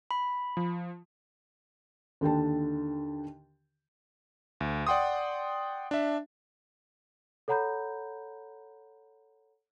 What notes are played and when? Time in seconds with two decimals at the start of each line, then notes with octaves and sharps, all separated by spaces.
0.11 B5
0.57 F3
2.21 D#2 D3 G5 A5
4.61 D2
4.87 D5 F#5 G5 C6 D#6
5.91 D4 E5
7.48 A4 C#5 F#5 A#5 B5 G6